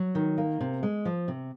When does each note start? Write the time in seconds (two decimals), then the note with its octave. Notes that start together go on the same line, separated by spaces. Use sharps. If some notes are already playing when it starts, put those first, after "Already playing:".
Already playing: F#3
0.15 D#3
0.38 A#3
0.61 C3
0.83 G#3
1.05 F3
1.28 C3